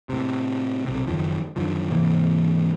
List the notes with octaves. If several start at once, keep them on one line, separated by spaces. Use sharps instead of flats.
A2 C3
B1 C3
F#1 F#2 D#3 F3
F#2 D3 D#3 F3
G#2 C3 E3 A#3